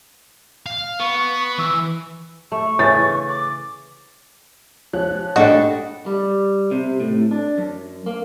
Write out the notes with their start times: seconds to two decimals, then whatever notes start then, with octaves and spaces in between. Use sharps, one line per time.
0.66 F5
1.00 B3 C#6
1.58 E3 E6
2.52 A3 C#6
2.79 C#3 E3 A6
3.28 D6
4.93 F3 C#4 F#6
5.36 G3 D4 F#4 A4 D#5
6.06 G3
6.71 C3
7.00 A2
7.31 D4
7.58 F#2
8.06 A#3